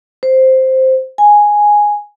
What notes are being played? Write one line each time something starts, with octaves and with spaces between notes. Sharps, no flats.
C5
G#5